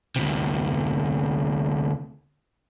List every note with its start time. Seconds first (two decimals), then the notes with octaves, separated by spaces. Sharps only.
0.16 D2 C3